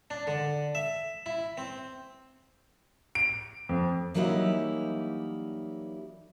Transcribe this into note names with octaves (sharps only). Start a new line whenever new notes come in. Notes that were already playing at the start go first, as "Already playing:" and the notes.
D4
D3
E5
E4
C4
D7
F2
E3 F#3 G3 A#3 D#4 E4